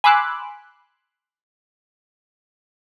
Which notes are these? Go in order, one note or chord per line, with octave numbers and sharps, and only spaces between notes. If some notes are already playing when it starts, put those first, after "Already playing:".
G#5 B5 C6 D6 E6 F#6